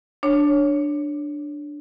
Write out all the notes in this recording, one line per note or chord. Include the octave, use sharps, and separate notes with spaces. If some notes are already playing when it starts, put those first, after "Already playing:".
D4 C#5